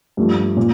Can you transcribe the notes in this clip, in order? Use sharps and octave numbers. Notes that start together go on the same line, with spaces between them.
G2 F3 A3
A#2